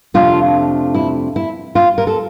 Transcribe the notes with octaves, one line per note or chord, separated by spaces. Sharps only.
F2 C3 F3 A3 D4 F4
E4
E4
F4
A#4
A4